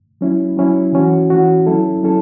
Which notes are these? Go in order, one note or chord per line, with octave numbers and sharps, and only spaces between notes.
F#3 C#4 E4
F#3 C#4 E4
E3 C#4 F#4
E3 C#4 F#4
F#3 C#4 E4 A4
F#3 C#4 E4 A4